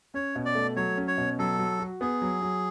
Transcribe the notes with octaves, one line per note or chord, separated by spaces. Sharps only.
C#4 C#5
B2
D5
A3
F#3 C#5
C#4
C#5
B2
F#3 A4
F#3
F#4
B3 G#4
F#3
F#3